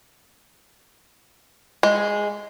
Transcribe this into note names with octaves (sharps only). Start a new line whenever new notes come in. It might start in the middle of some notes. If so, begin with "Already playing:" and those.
G#3